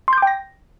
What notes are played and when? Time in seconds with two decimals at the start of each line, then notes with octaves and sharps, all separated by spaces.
0.08 C6
0.13 G6
0.18 D6
0.22 G5
0.27 A#6